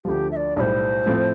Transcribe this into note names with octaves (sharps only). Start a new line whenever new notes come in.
D2 D3 F3 G4
E5
D5
B1 A2 G3 C5 D5
A2 F3 A3 C4